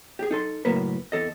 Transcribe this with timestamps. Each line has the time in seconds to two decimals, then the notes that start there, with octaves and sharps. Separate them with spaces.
0.19 G4 G#4
0.31 D#4 A4 C6
0.65 C#2 F#2 A2 A#3 A#4 B4
1.12 E2 A4 D#5